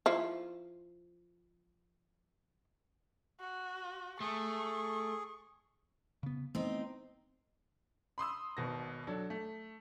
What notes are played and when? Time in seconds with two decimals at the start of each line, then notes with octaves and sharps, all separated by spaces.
0.06 F3 E4
3.40 F#4
4.20 A3 G#4 C#6
6.23 C#3 B3
6.55 A3 B3 C4 D#4
8.18 B5 C6 D#6 E6
8.57 G#1 B2 A#6
9.07 F#3 D4 A4
9.30 A3